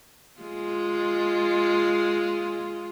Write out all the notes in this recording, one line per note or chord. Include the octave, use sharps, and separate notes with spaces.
G#3 F4